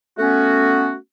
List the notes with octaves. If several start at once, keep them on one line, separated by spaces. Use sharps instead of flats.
A3 B3 C#4 F#4